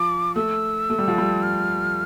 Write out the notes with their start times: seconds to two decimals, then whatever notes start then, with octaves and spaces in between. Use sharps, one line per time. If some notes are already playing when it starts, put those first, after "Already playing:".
Already playing: F3 D6
0.35 A3 E6
0.90 A3
0.99 G3
1.08 F3
1.18 G3
1.43 F6